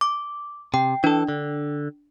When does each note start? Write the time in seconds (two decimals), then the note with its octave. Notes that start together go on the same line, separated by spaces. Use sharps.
0.01 D6
0.74 C3 G5
1.04 E3 D4 A4
1.29 D3